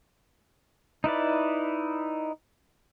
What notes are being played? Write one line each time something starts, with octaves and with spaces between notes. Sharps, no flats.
D#4 E4 B4 D5